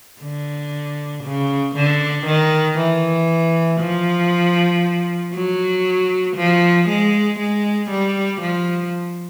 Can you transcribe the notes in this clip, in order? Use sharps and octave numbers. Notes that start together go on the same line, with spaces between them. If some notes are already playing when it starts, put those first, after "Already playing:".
D3
C#3
D3
D#3
E3
F3
F#3
F3
G#3
G#3
G3
F3